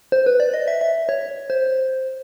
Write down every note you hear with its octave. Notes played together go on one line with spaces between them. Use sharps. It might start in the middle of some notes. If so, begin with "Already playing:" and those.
C5
B4
D5
D#5
E5
E5
C#5
C5